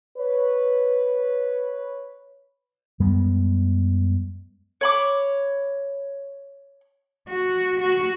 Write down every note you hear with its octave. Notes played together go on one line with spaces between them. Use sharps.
B4 C#5
F#2 G3 G#3 B3
C#5 B5 D6
F#4
F#4